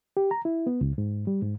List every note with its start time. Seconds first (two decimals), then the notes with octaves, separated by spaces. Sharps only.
0.17 G4
0.31 A#5
0.45 E4
0.67 B3
0.81 C#2
0.98 G#2
1.27 G3
1.42 G#2